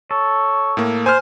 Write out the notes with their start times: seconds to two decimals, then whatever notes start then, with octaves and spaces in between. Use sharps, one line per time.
0.11 A4 C#5
0.77 A2 A#3
1.06 C5 G#5 F6